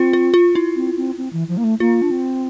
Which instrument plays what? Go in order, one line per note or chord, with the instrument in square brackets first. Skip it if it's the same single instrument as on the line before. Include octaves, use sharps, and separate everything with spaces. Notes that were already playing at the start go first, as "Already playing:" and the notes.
Already playing: [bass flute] C4 [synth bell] F4
[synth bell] F4
F4
E4
[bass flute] C4
C4
C4
E3
F3
A#3
A3
[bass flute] A#3 [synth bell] F4
[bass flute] D4
C4